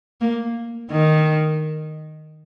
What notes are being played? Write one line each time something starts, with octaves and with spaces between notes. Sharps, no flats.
A#3
D#3